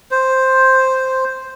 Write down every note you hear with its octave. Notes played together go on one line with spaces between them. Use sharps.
C5